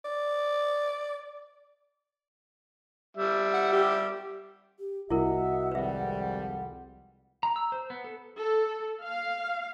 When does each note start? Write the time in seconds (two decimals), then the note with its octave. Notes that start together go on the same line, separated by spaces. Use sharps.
0.05 D5
3.17 G3 E5
3.53 F#5
3.72 G4
4.79 G4
5.10 C2 E4 F#4 A#4 D#5 E5 F#5
5.71 G#1 F2 G3 B4 E5
7.43 A#5
7.56 E6
7.72 C5
7.90 B3
8.04 A4
8.38 A4
9.02 F5